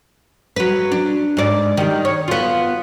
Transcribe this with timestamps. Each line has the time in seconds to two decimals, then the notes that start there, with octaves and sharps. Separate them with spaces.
0.56 F#3 B4
0.92 D4
1.37 G#2 D5
1.77 D#3 G3
2.05 C#5
2.28 B3 F4